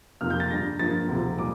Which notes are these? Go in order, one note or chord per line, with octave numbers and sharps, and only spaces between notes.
F2 C3 F3 A#3 F6
G6
A6
G2 D3 G3 A#6
G2 F3 A#3 A6
D2 C3 F3
A#2 G3 D6